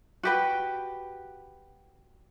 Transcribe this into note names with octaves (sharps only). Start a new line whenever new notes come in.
F#4 G4 B4